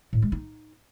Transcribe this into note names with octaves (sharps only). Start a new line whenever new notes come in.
A2
G#3
D#4